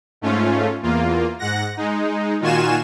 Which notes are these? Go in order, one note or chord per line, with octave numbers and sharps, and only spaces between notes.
G#2 A3 C#4 F4
E2 A#3 F4
G#2 F#5 A#6
G#3 D#4
A#2 D#3 F4 F#4 G#5 E7